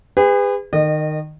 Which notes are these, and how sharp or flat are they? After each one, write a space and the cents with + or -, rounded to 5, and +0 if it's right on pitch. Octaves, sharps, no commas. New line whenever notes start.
G#4 -40 B4 +25
D#3 -15 D#5 -35